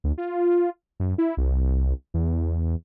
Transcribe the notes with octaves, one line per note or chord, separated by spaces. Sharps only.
D2
F4
F#2
E4
C2
E2